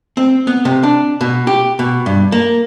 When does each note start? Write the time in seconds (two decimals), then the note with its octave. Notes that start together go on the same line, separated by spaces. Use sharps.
0.17 C4
0.47 B3
0.65 C3
0.83 D4
1.21 B2
1.47 G4
1.79 B2
2.06 G2
2.32 A#3